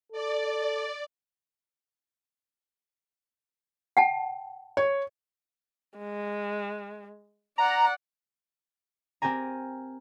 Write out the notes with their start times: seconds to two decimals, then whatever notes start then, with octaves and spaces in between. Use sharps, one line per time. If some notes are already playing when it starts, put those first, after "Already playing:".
0.12 A4 D5
3.97 F#5 G5 A5
4.77 C#5
5.99 G#3
7.58 D5 F#5 A#5
9.22 C4 G4 A#4 G#5 A#5